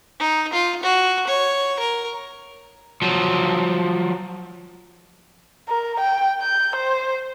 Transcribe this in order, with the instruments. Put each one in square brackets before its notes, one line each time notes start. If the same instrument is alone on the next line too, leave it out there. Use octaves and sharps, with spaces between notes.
[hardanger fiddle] D#4
F4
F#4
C#5
A#4
[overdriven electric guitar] F3 F#3
[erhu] A#4
G5
G6
C5